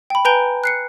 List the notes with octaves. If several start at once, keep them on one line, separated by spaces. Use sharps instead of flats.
G5 B5
B4 G#5 A#5 G6 D7 G7
F#6 C7 C#7